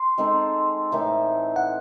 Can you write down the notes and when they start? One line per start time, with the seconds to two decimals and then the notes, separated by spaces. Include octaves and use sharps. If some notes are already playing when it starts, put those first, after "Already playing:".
Already playing: C6
0.18 G#3 C4 D#4 A4
0.92 A2 E3 A3 D#4
1.56 F#5